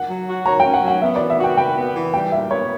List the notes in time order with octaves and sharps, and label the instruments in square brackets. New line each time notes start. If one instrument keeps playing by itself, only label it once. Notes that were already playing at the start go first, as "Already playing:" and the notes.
Already playing: [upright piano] F#5
[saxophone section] F#3
F#4
[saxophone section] C#5 [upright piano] A#5
[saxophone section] C#4 [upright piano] G5
[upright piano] F#5
[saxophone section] F#3
[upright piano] F#5
[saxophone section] B3 [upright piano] E5
[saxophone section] E3 [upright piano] D5
[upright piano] E5
[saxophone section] F#4
[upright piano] G5
[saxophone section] B4 [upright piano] G5
[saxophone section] B3
E3
[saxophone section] G3 [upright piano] G5
[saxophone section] A#2 [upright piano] E5
[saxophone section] B3 [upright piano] C#5